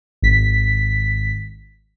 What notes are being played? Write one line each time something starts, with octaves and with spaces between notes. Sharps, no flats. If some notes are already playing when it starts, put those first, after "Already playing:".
G#1 B6